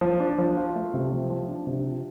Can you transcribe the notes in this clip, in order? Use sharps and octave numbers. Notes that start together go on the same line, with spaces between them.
F3
D4
F3
F4
A3
C3
F3
F3
D4
C3
F4